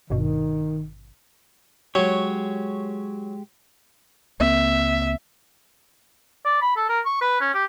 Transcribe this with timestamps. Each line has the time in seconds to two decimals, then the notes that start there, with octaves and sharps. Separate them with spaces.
0.10 G#1 G2 B2 D#3
1.95 F#3 G#3 G4 C#5
4.40 C#2 A#3 C4 E5
6.45 D5
6.62 B5
6.77 A4
6.89 A#4
7.06 C#6
7.21 B4
7.41 C#4
7.54 G4